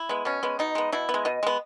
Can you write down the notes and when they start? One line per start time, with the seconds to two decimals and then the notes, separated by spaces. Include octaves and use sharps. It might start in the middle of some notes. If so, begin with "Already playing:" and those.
Already playing: E4
0.09 G#3 B3
0.25 B2 C#4
0.43 G#3 B3
0.59 B2 D#4
0.75 G#3 B3
0.92 B2 E4
1.09 B3
1.14 G#3
1.25 B2 D#5
1.43 G#3 B3